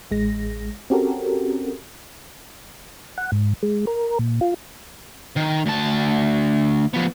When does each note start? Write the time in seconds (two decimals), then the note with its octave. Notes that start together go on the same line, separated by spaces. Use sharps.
0.11 A1 G#3 A#6
0.90 C4 C#4 F#4 G4 A4 A#4
3.18 F#5
3.32 G#2
3.63 G#3
3.87 A#4
4.19 A#2
4.41 F4
5.36 D#3
5.66 D2 A5
6.93 F3 B3